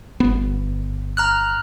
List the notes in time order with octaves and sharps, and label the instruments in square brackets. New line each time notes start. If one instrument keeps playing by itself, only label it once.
[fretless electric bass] G1 B3
[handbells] A#5 F6 F#6